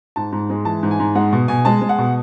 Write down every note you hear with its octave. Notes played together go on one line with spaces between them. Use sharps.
G#2 A5
G#2
G#3
E3 A5
G#2
G#5
G#2
G#3 F#5
B2
B2 G#5
G#3 A5
G#3
F#5
B2